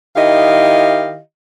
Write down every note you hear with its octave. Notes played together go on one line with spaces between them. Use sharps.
D#3 E4 G4 D#5 F5